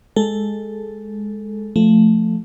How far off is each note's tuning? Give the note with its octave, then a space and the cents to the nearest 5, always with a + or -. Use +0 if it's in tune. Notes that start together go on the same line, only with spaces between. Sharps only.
G#3 +0 A4 +0
F3 +0 A3 +0